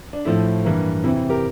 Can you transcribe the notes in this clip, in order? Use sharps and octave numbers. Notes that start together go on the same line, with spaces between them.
D4
A2 F3 A3 E4
G2 E3 A#3
F2 C3 E3 E4
E4
G4 A#4